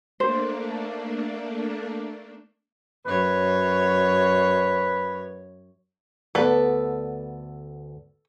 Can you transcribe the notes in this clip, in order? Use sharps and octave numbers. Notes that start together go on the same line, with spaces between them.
A3 A#3 D4 C5
F#2 B4 C#5
D2 B3 A4 B4 D5